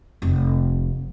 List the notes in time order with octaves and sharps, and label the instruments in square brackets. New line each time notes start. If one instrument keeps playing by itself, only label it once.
[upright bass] F1